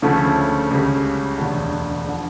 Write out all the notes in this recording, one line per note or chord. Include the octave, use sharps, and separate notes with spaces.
D2 C#3 F3 A3
C#2 C#3 G3
E1 D2 D3
D3 F3